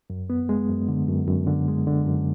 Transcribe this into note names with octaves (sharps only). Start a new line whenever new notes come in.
F#2
B3
G#3
F#2
D3
F#2
F#2
D3
G#3
D3
F#2